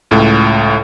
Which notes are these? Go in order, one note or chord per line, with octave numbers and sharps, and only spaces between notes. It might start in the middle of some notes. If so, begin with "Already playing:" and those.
C#2 A2